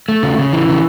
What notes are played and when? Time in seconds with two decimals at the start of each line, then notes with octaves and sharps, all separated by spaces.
0.09 A3
0.23 C#3
0.38 C#3
0.53 E3
0.68 C#3